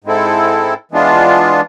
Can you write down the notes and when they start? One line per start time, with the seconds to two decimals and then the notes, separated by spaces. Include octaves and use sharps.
0.04 G#2 G#3 C4 E4 A4
0.91 E3 G#3 B3 D4 F4